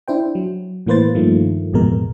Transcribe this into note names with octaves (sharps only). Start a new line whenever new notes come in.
D4 E4 C5 G5
F#3
A2 E3 A#3 B4 C5 A6
G2 D#3 F3 A3 A#3
A1 F2 B2 G#3 A#4